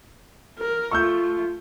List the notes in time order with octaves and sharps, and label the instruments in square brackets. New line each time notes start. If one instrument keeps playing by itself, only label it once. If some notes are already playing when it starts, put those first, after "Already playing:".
[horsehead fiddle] A#4
[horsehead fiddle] A3 F4 [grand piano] C#6 E6 G6